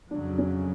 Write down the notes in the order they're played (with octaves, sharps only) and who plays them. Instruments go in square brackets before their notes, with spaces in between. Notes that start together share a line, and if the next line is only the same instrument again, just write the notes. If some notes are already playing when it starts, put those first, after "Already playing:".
[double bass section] F2 C#3 F#3 [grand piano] D4
[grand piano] C#4